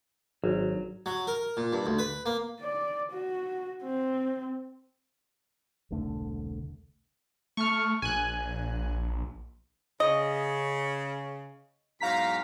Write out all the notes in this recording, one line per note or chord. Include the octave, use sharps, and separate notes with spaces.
G#1 F#3
F#3
A#4
A#2
G2
D2
B4
A#3
D5
F#4
C4
E1 C2 D3 A3
A3 C#6 F6
A#1 G#5 F#6
C#3 D#5
E2 G#2 F#3 F5 A#5 B6